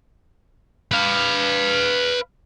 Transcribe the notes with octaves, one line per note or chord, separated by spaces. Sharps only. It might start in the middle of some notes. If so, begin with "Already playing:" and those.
B4 F5